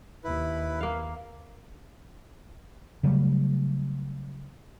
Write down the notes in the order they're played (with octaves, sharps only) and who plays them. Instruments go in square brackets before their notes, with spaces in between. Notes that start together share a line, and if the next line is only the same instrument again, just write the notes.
[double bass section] D#2 [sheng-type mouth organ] E4 B4
[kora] A#3 F5
[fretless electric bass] C#3 F#3 G3 A3